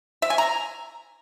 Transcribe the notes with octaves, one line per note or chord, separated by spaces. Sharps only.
E5
G#5
A#5